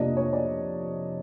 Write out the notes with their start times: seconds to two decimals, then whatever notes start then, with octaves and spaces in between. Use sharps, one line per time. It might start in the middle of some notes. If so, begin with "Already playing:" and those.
Already playing: F2 C3 F3 A#3 D4 D#5
0.17 C#5
0.33 D5